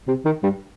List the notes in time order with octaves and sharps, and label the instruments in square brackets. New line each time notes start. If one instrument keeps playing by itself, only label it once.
[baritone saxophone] C3
D#3
G2